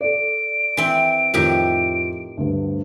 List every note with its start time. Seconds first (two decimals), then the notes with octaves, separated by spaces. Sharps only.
0.01 A4 D5 D7
0.77 E3 C4
1.34 F2 A2 D#3 G4
2.37 D2 G2